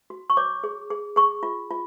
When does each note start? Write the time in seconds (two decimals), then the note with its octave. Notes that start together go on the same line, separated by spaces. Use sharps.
0.10 F#4
0.30 C#6
0.37 C#5 D6
0.64 G#4
0.90 G#4
1.16 G#4 C#6
1.43 F4
1.71 F4